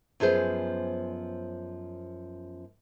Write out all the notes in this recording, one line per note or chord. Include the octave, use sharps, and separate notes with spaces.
F#2 F3 B3 G#4 C5